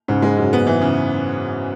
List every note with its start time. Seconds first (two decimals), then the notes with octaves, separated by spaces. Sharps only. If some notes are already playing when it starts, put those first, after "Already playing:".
0.08 G#2 C#3
0.22 G#3
0.37 F#2 C#3
0.53 B3
0.67 E3
0.81 C#3